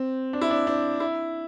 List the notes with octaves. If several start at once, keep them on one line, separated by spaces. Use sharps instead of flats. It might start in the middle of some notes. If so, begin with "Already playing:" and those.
Already playing: C4
D4
E4
D4
D4
E4